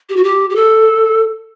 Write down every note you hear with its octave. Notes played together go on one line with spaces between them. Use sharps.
G4
F#4
G4
G4
A4